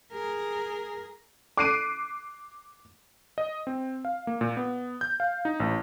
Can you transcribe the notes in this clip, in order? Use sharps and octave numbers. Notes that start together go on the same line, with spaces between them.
G#4 A#4
D6 F#6 C7 D7 D#7
D#5
C4
F5
A#3
A#2
B3
G6
F5
D#4
A1